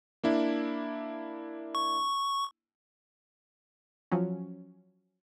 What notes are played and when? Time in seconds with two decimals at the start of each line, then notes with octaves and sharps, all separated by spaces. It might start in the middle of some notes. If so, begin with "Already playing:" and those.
0.24 A#3 D4 E4
1.75 C#6
4.11 F3 F#3 C#4